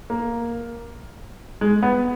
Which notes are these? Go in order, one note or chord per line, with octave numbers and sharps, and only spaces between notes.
A#3
G#3
B3